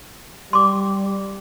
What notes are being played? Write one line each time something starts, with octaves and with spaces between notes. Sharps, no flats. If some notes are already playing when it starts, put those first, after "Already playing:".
G3 C6 D6